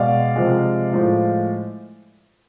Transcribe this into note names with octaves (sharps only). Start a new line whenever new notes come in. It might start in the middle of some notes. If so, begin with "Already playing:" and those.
Already playing: B2 G#3 D5 F5
C3 F3 G#3
A2 F3 G#3